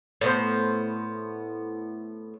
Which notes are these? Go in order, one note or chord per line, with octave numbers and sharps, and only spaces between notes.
A2 B3 C5